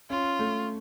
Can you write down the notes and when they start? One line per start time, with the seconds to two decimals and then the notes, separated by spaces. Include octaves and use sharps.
0.10 C#4 F4
0.39 A3